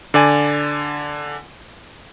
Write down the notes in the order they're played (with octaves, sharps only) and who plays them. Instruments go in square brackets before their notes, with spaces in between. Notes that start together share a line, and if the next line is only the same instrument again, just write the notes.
[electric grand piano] D3 D5 G#5